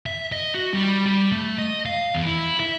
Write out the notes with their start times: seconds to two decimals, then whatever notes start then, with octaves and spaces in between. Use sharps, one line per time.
0.06 E5
0.32 D#5
0.54 F#4
0.74 G3
1.06 G3
1.32 A3
1.58 D#5
1.86 F5
2.15 E2
2.26 E4
2.60 E5